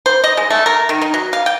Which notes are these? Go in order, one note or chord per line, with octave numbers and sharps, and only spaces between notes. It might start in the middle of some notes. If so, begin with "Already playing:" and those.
C5
D#5
G#3
A3
A#4
D#3
D#4
F#3
F5
G5